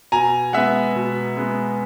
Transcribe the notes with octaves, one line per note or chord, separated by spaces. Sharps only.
B2 G#5 A#5
G#3 B3 E5 F#5
B2
G#3 B3